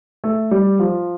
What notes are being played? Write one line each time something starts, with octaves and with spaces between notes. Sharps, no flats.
A3
G3
F3